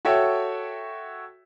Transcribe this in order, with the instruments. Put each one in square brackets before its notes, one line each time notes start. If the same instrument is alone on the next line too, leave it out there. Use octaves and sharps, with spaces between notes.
[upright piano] F#4 A4 C#5 E5 G5